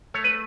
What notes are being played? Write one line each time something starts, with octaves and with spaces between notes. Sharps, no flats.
A3 C#5
B4